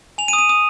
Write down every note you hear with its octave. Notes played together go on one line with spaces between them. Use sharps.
G#5 F7
D#7
D#6
D#7
D#6